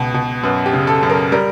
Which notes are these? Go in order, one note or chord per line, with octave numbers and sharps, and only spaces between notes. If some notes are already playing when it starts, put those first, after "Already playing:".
Already playing: C#2 B2
B2
F#2 B4
G4
C#3
A4
F#2
A#4
G3 A#4